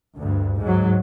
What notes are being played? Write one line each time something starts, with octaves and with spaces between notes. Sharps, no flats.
D2 G2
G#2 F#3